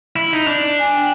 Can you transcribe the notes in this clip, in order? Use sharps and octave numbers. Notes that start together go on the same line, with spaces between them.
E4
D#4
D4
G#5
G5